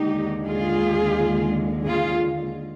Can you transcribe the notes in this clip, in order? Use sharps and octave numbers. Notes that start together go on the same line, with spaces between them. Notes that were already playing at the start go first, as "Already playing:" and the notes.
Already playing: D#2 D3 G#3 D#4 G4
F4 G#4
F4 G#4